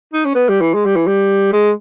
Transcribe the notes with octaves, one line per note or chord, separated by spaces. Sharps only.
D#4
C#4
B3
G3
E3
G#3
G3
E3
G3
G#3